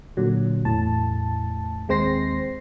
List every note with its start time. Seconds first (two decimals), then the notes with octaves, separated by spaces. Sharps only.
0.17 A#2 D3 F#3
0.65 E2 A2 A5
1.88 D#2 G#3 C4 C5 A#6 C7